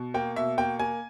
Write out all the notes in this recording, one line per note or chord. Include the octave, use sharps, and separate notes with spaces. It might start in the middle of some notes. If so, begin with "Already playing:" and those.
Already playing: B2
A#3 G5
B2 E5
A#3 G5
A#3 G#5